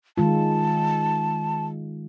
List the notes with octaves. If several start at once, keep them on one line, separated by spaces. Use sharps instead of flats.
D#3 G#3 F4 A5